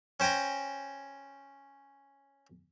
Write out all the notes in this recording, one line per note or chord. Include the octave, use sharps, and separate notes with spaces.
C#4 C5 G5 G#5 A#5